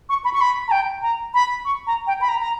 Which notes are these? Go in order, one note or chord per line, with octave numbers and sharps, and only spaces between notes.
C#6
B5
C#6
B5
A#5
G5
A#5
B5
C#6
A#5
G5
B5
A#5
A#5